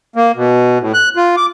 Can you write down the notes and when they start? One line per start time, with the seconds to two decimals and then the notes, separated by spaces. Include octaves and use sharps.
0.16 A#3
0.36 B2
0.81 A2
0.94 F#6
1.17 F4
1.37 D6